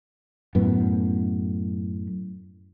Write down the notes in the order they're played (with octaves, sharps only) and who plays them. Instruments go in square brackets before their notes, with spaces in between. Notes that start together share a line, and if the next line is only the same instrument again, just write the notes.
[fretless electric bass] F#2 A2 B3